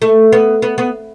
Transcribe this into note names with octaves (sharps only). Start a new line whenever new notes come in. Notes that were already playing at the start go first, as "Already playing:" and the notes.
A3
B3
B3
B3